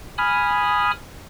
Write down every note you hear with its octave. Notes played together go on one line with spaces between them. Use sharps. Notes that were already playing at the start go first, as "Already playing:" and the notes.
G#5 B5 D#6 F6